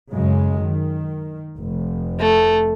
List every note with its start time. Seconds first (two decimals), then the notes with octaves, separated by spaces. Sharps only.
0.13 F#2 C#3 G#3
0.62 D#3
1.58 F1
2.19 A3